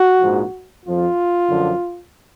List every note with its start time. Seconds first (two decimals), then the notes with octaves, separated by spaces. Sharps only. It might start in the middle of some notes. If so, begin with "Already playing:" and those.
Already playing: F#4
0.20 A#1 G#2 F3
0.84 F2 F3 F4
1.49 F#2 D3 F3